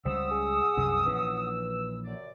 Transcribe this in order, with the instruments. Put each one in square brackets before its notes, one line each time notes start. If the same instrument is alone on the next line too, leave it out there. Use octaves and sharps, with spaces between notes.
[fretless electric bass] C#2 C#3 G3 [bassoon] C4 [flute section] F#5 D#6 [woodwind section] E6
[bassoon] G#4
[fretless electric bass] C2 F#2 C3
[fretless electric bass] A#1 E3 C#4 [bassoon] B4
[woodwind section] F#2 C3 D5